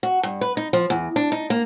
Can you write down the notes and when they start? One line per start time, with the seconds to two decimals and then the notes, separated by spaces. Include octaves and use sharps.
0.03 F#4
0.23 G2
0.41 B4
0.57 D#4
0.73 F3
0.90 E2
1.16 D4
1.32 D#4
1.50 A#3